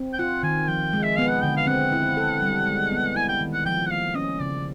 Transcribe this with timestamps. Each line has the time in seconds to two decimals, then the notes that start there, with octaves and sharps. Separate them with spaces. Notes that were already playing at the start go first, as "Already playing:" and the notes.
Already playing: C4
0.13 G5
0.19 F4 F#5
0.43 D#3 G#5
0.68 F3 G5
0.93 G#3
1.03 E5
1.16 B3 F5
1.29 F#5
1.42 D3 G5
1.57 F5
1.67 C4 F#5
1.92 E4
2.17 A4
2.42 G3
2.67 G#3
2.92 B3
3.16 E4 G#5
3.29 G5
3.41 D#3
3.53 F#5
3.66 F3 G5
3.86 F#5
3.91 A#3 F5
4.15 C#4 D#5
4.40 C#3 D5